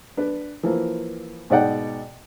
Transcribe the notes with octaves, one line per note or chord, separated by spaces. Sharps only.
D4 B4
E3 F3 A#3
G#2 B2 D5 F#5 G5